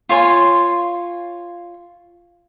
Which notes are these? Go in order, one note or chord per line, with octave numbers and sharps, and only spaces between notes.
F4 C#5 G#5 C6